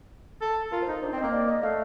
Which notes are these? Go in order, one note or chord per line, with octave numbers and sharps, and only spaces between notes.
A4
F4 A#4
C5
D#4
D4 C5
C4
D#5
A#3
D5
D#5
A3 F5